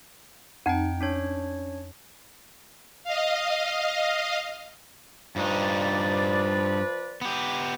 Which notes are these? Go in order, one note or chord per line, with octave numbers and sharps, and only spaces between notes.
F2 C4 D#4 G5
C#4 D4 C#5
D#5 F5
G2 F3 D#4 B4 D5
B3 G4